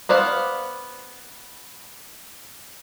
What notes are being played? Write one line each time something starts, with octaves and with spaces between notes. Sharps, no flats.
B3 C5 D5 F5 F#5